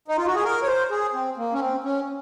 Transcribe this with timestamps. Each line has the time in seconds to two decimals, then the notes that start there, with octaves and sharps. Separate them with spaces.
0.08 D#4
0.17 F4
0.27 F#4
0.35 G#4
0.44 A#4
0.63 C#5
0.67 C5
0.90 G#4
1.14 C4
1.37 A#3
1.54 C#4
1.60 C4
1.84 C#4